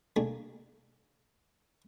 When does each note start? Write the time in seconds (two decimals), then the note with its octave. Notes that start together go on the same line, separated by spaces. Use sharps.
0.16 G3 A3 A#3 D4 D#4 G#4